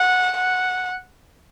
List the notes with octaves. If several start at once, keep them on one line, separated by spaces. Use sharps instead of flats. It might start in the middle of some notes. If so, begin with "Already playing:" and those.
Already playing: F#5
F#5